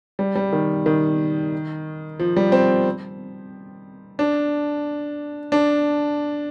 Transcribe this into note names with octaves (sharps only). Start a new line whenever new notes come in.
G3
G3
D#3
D#3
F3
G3
C4
D4
D4